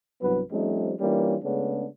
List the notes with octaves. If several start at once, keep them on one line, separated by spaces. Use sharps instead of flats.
C2 G2 F#3 B3 B4
F3 G3 A3 C4 C#4 D#4
E3 G3 A#3 C#4 D4 F4
C#3 G#3 A3 B3 C#4 D4